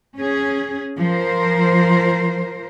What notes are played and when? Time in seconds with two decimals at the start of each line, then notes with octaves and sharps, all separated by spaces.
0.16 C#4 G#4
0.98 F3 A#4 C5